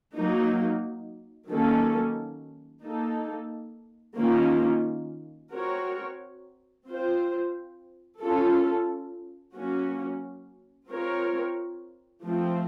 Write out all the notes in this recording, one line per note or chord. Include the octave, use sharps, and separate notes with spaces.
F#3 A#3 D#4
D#3 F#3 A#3 C#4 A4
A#3 D#4 A4
D#3 A#3 C#4 F4
C4 F#4 A#4 C#5
C4 F4 C5
C#4 F4 A4
F#3 A#3 C#4 F#4
C4 F4 A#4 C#5
F3 A3 C4